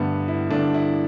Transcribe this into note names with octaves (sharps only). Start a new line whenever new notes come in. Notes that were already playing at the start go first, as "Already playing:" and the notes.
Already playing: G2 D3 A3 B3
E4
G2 D3 A3 D4
E4